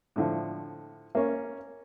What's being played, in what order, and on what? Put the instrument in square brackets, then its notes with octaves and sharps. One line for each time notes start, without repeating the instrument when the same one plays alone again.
[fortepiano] A2 D3 F3
A#3 C#4